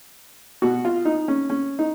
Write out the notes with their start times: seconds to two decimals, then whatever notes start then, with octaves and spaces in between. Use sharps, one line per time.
0.62 B2 F#4
0.85 F4
1.05 D#4
1.28 C#4
1.50 C#4
1.79 D#4